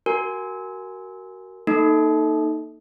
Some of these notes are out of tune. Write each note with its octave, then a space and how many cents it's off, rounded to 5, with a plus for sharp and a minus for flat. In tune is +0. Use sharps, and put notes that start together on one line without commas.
F#4 +20 A#4 +0 G#5 +0
A#3 +0 D#4 +0 A4 +0